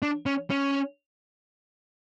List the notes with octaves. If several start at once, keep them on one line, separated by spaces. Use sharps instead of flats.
D4
C#4
C#4